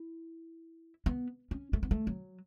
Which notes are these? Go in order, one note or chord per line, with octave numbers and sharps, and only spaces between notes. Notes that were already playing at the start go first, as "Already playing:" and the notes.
Already playing: E4
B3
C#4
A3
B3
A3
F#3